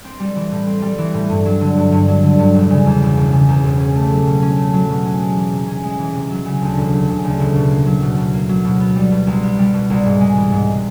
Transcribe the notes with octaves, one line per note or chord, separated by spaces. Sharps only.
C4
G3
E3
A2
C4
G3
E3
A2
G2
F#3
D3
G2
G2
F#3
D3
G2
E1
C#3
E2
E1
E1
C#3
E2
E1
C#4
A3
F#3
B2
C#4
A3
F#3
B2
C#4
G#3
E3
C3
C#4
G#3
E3
C3
F#3
C#3
D2
E1
F#3
C#3
D2
E1
B2
A#3
F#3
B2
B2
A#3
F#3
B2
B3
G3
B2
C2
B3
G3
B2
C2
G#2
G#3
E3
G#2